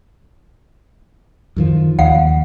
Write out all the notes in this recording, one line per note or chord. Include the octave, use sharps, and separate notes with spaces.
F#2 D#3 F3
D#2 F5 F#5